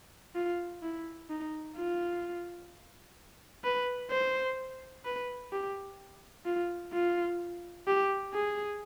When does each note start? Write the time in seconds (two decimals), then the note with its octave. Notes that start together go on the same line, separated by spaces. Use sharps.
0.35 F4
0.83 E4
1.30 D#4
1.76 F4
3.65 B4
4.11 C5
5.05 B4
5.53 G4
6.45 F4
6.93 F4
7.87 G4
8.34 G#4